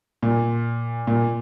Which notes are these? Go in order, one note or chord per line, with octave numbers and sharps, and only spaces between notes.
A#2
A#2